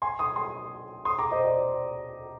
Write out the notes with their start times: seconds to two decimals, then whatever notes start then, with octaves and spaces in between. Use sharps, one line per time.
0.02 G#5 C6
0.19 C6 D#6
0.36 C6 D#6
1.05 C6 D#6
1.18 A#5 D6
1.31 C5 D#5
1.45 D5